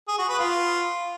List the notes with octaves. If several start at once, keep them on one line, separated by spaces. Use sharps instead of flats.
G#4
F#4
B4
F4